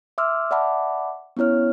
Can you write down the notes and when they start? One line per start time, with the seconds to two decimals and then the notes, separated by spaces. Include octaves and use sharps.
0.18 E5 C6 D6 E6 F6
0.51 D5 E5 F#5 A5 B5 D6
1.37 B3 C#4 E4 C#5 F6